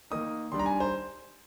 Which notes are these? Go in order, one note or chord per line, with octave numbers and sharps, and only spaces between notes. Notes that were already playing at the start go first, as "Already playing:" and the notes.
D#3 A#3 D#4 D#6
D#3 G3 D4 C6
A#5
G#5
C5